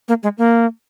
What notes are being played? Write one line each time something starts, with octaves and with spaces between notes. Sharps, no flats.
A#3
G#3
A#3